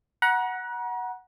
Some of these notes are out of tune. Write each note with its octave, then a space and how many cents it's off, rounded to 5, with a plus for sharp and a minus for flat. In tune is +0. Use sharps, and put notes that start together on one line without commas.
F#5 +0 A#5 +40